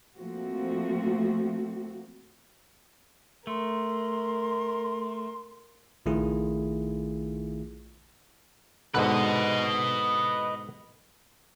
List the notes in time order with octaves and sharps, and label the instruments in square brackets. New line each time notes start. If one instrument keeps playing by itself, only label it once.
[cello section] F3 A3 A#3 C4 F#4
[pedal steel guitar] A3 [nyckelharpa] A#4 [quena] C6
[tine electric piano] A#1 D#3 A3 E4 F4 G#4
[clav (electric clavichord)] G#2 B2 D3 [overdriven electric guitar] B4 D#5